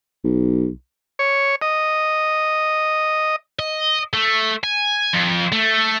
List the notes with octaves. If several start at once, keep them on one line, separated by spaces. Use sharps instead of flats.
B1
C#5
D#5
D#5
A3
G#5
F2
A3